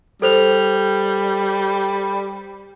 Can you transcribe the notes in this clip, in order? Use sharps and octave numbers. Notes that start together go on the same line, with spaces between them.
G3 A4 C5 F7